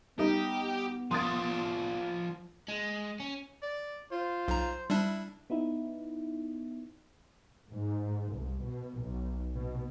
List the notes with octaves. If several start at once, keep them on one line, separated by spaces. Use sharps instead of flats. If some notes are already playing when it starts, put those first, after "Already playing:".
G3 B3 D#4 G4
F3 D5 C6 D#6 A6
G#3
C#4
D5
F4 C5
B1 A#5
G3 D4 E4
B3 D#4 E4
G#2
C2
B2
B1
B2